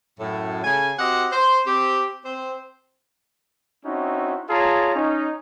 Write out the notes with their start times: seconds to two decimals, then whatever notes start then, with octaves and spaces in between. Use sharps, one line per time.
0.20 F#2 A2
0.64 C#3 A4 G#5
0.99 C4 F#4 G4 D#5 F#5
1.32 C5
1.67 C4 G4
2.25 C4 C5
3.85 C4 C#4 D#4 E4 F#4
4.50 F4 G#4 C#5 A5 A#5
4.95 C#4 D#4